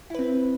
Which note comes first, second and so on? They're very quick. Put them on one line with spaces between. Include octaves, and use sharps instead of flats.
E4 B4 C4